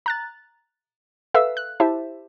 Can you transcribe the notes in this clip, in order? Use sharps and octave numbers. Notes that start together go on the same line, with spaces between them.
A#5 F#6 A6
A4 B4 E5 F5 E6
F#6
E4 G4 C5 E5 A5